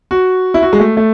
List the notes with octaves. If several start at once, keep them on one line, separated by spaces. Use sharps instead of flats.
F#4
E4
F#4
G#3
A3
A3